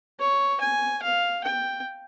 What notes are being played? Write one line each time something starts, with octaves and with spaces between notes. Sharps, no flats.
C#5
G#5
F5
G5